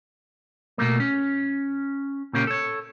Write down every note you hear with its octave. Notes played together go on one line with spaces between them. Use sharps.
B2 A3 A#3
C#4
A#2 C#3 A#3 C#4 G4
A4 C#5